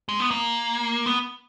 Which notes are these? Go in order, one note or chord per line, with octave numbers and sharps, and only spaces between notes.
G#3
B3
A#3
B3